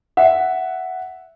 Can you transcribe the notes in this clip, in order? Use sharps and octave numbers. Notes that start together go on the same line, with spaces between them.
E5 F#5